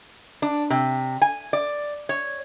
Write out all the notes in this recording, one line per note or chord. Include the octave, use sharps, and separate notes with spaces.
D4
C3
G#5
D5
C#5